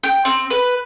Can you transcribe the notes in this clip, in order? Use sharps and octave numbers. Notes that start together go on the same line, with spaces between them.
G5
C4
B4